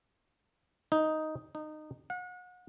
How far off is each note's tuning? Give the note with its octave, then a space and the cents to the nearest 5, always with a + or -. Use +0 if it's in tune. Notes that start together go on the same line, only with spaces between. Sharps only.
D#4 +5
D#4 -20
F#5 -35